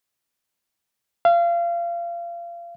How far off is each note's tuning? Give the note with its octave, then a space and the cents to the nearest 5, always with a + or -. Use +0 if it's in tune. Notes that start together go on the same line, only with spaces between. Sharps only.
F5 -30